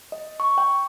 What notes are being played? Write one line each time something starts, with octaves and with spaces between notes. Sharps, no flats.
D#5
C#6
G5